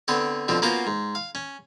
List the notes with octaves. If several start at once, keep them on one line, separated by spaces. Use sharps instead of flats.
D3 B3 C4 C#5
B2 D3 F3 C4
A#3 B3 C#4 F4 F#4 C5
G#2
F5
C#4